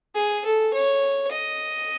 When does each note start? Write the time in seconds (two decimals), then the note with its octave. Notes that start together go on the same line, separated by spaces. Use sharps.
0.15 G#4
0.45 A4
0.74 C#5
1.32 D#5